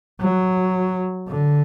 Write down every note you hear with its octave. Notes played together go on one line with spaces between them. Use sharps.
F#3
D3